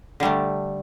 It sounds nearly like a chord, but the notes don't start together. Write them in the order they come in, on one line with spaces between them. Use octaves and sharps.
D3 G3 A3